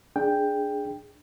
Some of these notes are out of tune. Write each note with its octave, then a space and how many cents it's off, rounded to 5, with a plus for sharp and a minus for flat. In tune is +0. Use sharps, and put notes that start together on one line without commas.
D4 +0 G#4 +0 G5 +5